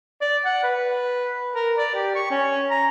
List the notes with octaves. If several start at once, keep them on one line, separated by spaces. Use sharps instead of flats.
D5
F#5
B4
A#4
D5
G4
C#6
C#4
A#5